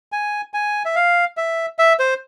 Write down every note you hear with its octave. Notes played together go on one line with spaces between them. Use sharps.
G#5
G#5
E5
F5
E5
E5
C5